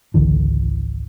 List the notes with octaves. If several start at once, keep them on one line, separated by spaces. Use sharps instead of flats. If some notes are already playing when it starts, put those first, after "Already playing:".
G#1 C#2 D3 E3